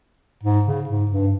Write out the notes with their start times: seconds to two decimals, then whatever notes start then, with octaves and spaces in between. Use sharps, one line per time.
0.43 G#2
0.66 C#3
0.89 G#2
1.11 G2